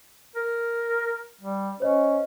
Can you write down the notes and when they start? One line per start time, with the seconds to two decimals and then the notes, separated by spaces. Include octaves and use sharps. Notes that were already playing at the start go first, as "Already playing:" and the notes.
0.36 A#4
1.42 G3
1.80 C#4 C5 C#5 D#5